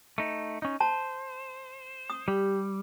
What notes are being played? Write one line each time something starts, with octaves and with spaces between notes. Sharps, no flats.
A3 D#4
C#4 D#4
C5 A5
D#6
G3 G4